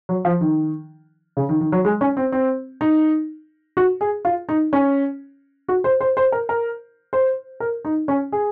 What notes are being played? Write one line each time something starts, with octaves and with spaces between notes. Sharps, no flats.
F#3
F3
D#3
C#3
D#3
D#3
F#3
G#3
C#4
C4
C4
D#4
F#4
G#4
F4
D#4
C#4
F#4
C5
C5
C5
A#4
A#4
C5
A#4
D#4
C#4
G#4